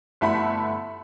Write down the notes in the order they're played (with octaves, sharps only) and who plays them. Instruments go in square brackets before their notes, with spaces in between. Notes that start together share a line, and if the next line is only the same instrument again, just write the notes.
[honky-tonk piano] G1 A3 E4 F#5 B5